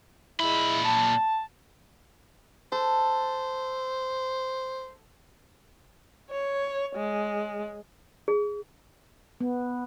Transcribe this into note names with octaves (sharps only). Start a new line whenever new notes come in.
A#2 G#3 E4 B5
A5
A4 C5
C#5
G#3
G#4
B3